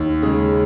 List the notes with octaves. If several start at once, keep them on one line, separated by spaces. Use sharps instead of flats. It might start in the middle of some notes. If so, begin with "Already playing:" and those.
Already playing: D#2
C#3 G#3